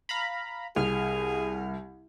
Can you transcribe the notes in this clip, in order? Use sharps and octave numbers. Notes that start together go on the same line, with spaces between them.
F5 A#5 B5
C2 G#4 F6